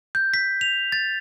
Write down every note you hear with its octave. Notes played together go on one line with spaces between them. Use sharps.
G6
B6
F7
A6